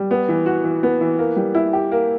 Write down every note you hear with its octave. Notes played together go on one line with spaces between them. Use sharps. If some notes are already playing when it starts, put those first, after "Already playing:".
Already playing: G3
B3
E3
F#4
E3
B3
E3
A#3
G3
E4
G4
A#3